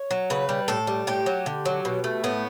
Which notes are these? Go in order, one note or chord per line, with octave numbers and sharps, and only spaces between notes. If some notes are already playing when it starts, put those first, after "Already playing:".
Already playing: C#5
F#3
C#3 B4
G3
A2 A4
G3
A2 G4
F#3
D3
F#3
B2
A3
A2 B3